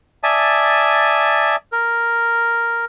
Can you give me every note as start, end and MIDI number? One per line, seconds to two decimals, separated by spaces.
0.24 1.56 74
0.24 1.56 76
0.24 1.56 80
0.24 1.56 81
0.24 1.56 87
1.72 2.85 70